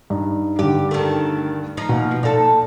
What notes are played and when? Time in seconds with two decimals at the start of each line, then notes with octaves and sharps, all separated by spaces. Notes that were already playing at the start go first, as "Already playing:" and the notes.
0.10 G2 D#4
0.59 G2 D3 G4
0.91 D#3 A3
1.77 F3 D#4
1.89 B2 A#3
2.23 A#2 D#4 A4